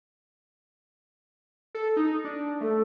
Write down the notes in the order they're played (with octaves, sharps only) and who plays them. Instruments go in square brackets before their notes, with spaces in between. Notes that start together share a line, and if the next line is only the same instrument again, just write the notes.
[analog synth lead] A4
D#4
D4
[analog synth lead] A3 [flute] A4